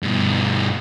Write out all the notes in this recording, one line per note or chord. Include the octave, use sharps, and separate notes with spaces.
G2 B2